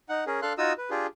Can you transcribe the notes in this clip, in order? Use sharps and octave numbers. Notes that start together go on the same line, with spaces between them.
D#4 F#5
C#4 G#4 A#4
D4 A4 F5 C6 F#6
D#4 F4 F#4 D#6 E6
B4
D4 F4 G4 G#4